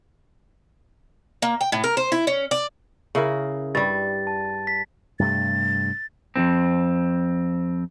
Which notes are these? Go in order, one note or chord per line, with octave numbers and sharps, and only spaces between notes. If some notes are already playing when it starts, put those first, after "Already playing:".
A#3
G5
A2
A#4
C5
E4
C#4
D5
C#3 E4 A#4
G2 G3 A6
A5
B6
G2 C3 A3 A6
F2 G#2 C4